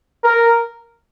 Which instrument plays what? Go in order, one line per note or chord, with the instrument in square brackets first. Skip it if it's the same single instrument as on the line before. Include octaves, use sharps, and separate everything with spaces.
[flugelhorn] A#4